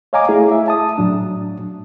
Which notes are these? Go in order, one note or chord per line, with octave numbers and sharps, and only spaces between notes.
C#5 D#5 F5 G#5 A#5 D6
A3 E4 G#4
E5
A5 D#6
A2 F#3 D4